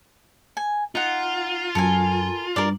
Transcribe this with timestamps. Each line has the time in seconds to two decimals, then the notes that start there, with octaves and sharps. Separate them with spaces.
0.57 G#5
0.95 D#4 F4 F#5
1.75 F#2 A4 A#4 G#5
2.56 G2 A#4 D5